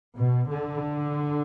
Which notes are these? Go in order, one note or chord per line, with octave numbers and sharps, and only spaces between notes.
B2
D3